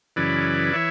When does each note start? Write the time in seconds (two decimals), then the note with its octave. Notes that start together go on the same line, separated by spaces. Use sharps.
0.16 F#2 C#3 E3 B4 D5
0.73 E3 C#5 E5